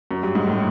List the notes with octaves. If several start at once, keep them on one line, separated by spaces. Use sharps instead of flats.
F#2
G2
G#2
A2